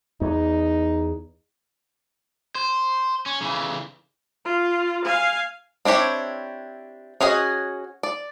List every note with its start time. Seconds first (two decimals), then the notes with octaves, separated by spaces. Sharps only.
0.21 E2 D#4
2.55 C5
3.26 C#4
3.42 C#3 E3
4.45 F4
5.05 F5 G#5
5.85 C4 D4 E4 G4 C#5
7.21 C#4 F#4 G#4 C5 D#5
8.03 D5